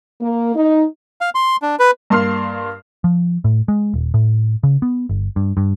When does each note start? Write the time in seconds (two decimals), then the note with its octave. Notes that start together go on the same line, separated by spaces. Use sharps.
0.21 A#3
0.55 D#4
1.21 F5
1.35 C6
1.62 D4
1.79 B4
2.10 G2 A#3 C6 F6 C7
3.04 F3
3.44 A2
3.68 G#3
3.94 D#1
4.14 A2
4.63 C#3
4.82 B3
5.09 G1
5.36 G2
5.57 G2